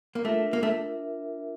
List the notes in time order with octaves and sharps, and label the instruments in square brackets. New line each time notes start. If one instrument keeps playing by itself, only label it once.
[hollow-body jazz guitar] A#3
[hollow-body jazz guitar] A3 [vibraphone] D4 F4 A#4 E5
[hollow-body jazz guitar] A#3
A3